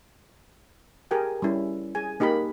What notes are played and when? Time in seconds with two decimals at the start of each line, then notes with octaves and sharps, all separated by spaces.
1.11 G4 G#4 A#4 G5 G#5
1.42 G3 C#4 E4
1.95 G#4 G#5
2.20 A#3 D#4 G4 A#4 B5